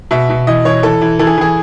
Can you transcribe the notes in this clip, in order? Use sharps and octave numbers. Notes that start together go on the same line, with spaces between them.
B2 E5
B2
E3 D#5
E3 C#5
E3 A4
E3
E3 A4
G#4
E3 G#4